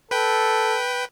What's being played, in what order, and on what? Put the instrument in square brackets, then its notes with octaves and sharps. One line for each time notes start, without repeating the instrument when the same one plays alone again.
[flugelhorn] A4 [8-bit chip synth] B4 G5